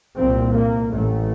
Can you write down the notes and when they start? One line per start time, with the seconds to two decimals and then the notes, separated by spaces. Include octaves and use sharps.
0.17 C2 A#2 C4
0.55 A#3
0.93 A1 A2 A3